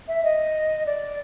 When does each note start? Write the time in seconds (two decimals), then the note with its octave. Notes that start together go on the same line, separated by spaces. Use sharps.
0.08 E5
0.24 D#5
0.86 D5